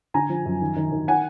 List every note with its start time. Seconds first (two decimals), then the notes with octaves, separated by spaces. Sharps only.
0.14 D3 G#5 A#5
0.30 F3
0.46 F#2
0.61 D#3
0.76 D#3
0.92 D#3
1.08 F#5 G#5